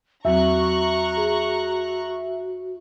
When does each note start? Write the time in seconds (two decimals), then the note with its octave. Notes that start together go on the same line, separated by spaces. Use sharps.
0.25 E2 F#3 C4 F#4 E5 A#5 C#6 F#6
1.17 G#4